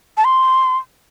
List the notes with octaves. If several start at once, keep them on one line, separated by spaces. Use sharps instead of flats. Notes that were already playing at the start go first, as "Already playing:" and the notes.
A5
C6